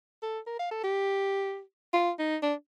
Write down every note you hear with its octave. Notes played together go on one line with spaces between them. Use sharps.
A4
A#4
F5
A4
G4
F4
D#4
D4